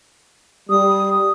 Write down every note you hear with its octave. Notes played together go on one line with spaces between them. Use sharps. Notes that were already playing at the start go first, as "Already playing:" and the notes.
G3 D#6